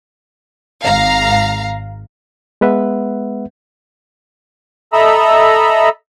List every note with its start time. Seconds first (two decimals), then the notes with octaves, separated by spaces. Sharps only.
0.83 G#1 F5 A#5
2.61 G#3 B3 B4 E5 F#5
4.93 A4 D#5 E5 A#5 B5 E6